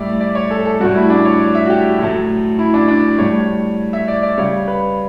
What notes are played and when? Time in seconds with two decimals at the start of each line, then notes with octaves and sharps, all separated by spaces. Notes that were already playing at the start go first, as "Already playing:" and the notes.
Already playing: A2 G3 D5 E5
0.21 D5
0.35 C#5
0.51 A4
0.65 A4
0.80 A2 G3 F#4
0.95 E4
1.10 D4
1.25 C#5
1.39 D5
1.55 E5
1.66 F#4
1.70 G4
1.99 A2 F#3 A3
2.59 E4
2.74 D4
2.88 D4
3.18 A2 G3 C#5
3.93 E5
4.08 D5
4.23 D5
4.38 C#3 G3 C#5
4.68 B4